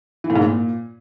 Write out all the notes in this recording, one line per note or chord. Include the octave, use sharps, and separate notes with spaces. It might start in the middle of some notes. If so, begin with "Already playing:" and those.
E3
A2
G#2
A#2